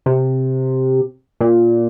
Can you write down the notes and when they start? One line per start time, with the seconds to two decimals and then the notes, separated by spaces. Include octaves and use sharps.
0.06 C3
1.41 A#2